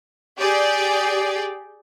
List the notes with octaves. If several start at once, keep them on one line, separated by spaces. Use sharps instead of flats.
G4 G#4 D5 G5